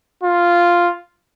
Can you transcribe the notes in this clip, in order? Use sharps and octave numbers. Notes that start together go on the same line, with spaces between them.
F4